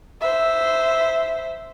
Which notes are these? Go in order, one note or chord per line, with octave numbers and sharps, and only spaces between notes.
C5 E5